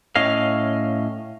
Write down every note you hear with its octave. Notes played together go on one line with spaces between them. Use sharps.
A2 C#4 D#5 F5